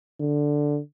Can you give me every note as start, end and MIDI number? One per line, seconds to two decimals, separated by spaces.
0.20 0.79 50